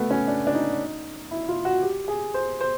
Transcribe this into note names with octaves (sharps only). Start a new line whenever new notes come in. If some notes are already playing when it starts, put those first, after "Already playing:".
Already playing: A3 B3
C#4
D4
D4
D#4
E4
F4
F#4
G4
G#4
C5
C5